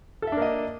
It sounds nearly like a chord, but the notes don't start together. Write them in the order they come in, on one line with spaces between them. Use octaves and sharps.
A4 E5 D4 A#3 D#5